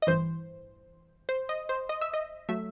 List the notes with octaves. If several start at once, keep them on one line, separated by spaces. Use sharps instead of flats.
D#5
A1 G2 E3 C5
C5
D#5
C5
D#5
E5
D#5
F#3 A3 E5